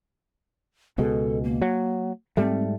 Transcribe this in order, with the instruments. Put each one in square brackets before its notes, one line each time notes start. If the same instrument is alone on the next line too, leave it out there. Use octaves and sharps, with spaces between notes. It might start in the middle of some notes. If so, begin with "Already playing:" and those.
[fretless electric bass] C#2 B2 G#3 [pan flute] A4
[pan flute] A#3
[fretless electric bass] F#3
[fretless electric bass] G#2 G3 A3 [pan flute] C4